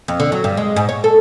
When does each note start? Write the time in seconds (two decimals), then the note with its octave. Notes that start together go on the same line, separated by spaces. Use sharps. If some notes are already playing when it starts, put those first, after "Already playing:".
0.08 F2
0.20 D3
0.32 F#3
0.44 G2
0.57 G#3
0.76 G#2
0.89 C#5
1.04 A4